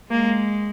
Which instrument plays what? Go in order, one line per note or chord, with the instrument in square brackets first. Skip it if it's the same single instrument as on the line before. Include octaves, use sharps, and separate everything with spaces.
[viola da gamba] G#3 [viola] A#3